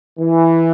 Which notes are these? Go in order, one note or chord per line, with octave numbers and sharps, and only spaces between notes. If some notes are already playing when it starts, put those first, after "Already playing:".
E3